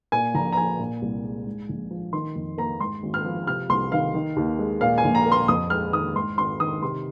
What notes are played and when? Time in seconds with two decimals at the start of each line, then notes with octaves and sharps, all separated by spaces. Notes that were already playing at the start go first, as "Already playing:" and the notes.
0.12 A#2 G#5
0.35 A#1 A#5
0.52 A#5
0.57 F3 G#5
0.79 A#2
1.02 C2
1.24 G#3
1.46 G#2
1.69 A#1
1.91 F3
2.13 D#3 C6
2.36 F2
2.58 A#3 A#5
2.80 G#2 C6
3.03 G#1
3.14 F6
3.25 F3
3.47 C3 F6
3.69 C2 C6
3.92 D#3 F5
4.14 D#3
4.36 D#2
4.59 G#3
4.81 A#2 F5
4.98 G#5
5.04 A#1
5.15 A#5
5.26 A#3
5.32 C6
5.48 F2 D#6
5.70 G#3 F6
5.93 D#3 D#6
6.15 G#2 C6
6.38 G#1 C6
6.60 D#3 D#6
6.82 C3 C6